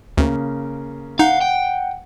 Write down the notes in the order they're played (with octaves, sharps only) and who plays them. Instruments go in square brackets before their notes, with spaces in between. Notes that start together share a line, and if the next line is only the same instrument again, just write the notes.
[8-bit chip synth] D2 [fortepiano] C#3 A#3
[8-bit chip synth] D#4 [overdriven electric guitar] F5 [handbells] F#5
[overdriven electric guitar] G5